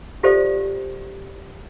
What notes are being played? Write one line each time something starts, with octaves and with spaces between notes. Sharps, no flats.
F4 G4 A4 C5 D5 E5